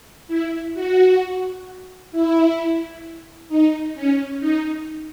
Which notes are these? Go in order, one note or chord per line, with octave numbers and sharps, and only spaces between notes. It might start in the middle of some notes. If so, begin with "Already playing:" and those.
E4
F#4
E4
D#4
C#4
D#4